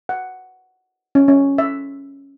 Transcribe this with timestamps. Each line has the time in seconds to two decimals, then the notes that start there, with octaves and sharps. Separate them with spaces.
0.09 F#5
1.15 C#4
1.28 C#4
1.58 E5